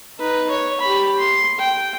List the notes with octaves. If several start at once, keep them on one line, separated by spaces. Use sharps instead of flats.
D#4 B4
C#5
G4 B5
C6
G5